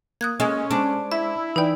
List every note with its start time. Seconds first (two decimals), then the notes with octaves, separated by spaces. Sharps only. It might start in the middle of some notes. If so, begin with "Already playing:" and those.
0.21 A#3 D#6 F#6 G#6
0.40 G#3 C#4
0.71 G#3 D4 C5 D6
1.12 E4 E5
1.56 E3 D#4 B4 D5 G5